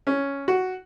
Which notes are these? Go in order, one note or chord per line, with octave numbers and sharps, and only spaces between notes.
C#4
F#4